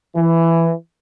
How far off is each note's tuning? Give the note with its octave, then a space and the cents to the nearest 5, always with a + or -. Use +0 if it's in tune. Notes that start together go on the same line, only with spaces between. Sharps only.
E3 +10